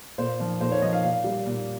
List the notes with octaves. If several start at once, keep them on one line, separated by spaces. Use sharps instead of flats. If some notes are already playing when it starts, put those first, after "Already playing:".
A#2 C5
F3
A#2 C5
C#5
F3 D#5
F5
A#2 F5
G3
A#2